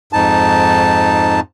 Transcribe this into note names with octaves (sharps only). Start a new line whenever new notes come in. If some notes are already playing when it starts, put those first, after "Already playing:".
F2 G#2 D#4 A5